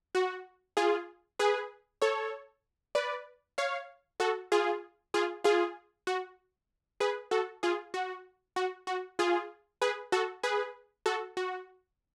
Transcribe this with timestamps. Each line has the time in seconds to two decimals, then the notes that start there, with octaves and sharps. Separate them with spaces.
0.15 F#4
0.77 F4 G#4
1.39 G#4 B4
2.02 A4 C#5
2.95 B4 D5
3.58 C#5 F5
4.20 F#4 A4
4.52 F4 G#4
5.14 F4 G#4
5.44 F4 G#4
6.07 F#4
7.00 G#4 B4
7.31 F#4 A4
7.63 F4 G#4
7.94 F#4
8.56 F#4
8.87 F#4
9.19 F4 G#4
9.82 G#4 B4
10.12 F#4 A4
10.43 G#4 B4
11.06 F#4 A4
11.37 F#4